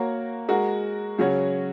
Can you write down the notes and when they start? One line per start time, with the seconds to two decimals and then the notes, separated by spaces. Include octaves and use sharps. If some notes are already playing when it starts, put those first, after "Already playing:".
Already playing: A#3 F#4 A#4 C#5
0.48 G#3 F#4 A#4
1.18 C#3 F#3 C#4 F#4 C#5